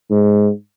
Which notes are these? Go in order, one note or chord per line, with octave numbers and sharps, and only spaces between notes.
G#2